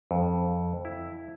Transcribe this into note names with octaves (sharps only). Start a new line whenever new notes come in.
F2
E4